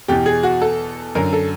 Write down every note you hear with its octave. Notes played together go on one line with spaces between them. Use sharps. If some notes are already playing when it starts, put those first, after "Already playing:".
E2 B2 G4
G#4
F#4
A4
F#2 D3 A#4
A4